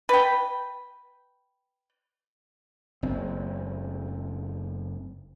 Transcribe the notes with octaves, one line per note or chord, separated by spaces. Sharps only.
B4 G5
F#1 C4